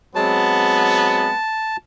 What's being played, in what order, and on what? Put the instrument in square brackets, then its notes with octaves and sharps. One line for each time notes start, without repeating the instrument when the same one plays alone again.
[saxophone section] F#3 G#3 C4 [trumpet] B3 [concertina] A5